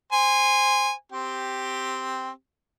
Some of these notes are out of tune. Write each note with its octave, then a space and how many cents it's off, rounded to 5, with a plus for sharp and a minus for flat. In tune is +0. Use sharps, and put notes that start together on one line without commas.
C5 -5 G#5 -20
C4 +0 G4 +0